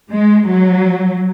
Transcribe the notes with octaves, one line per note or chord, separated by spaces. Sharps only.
G#3
F#3